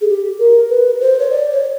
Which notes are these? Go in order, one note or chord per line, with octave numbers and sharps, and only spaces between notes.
G#4
G4
A#4
B4
C5
C#5
D5
C#5